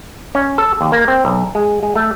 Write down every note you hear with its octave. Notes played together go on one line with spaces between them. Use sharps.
C#4
A4
D#2
A#3
C4
B1
G#3
G#3
A3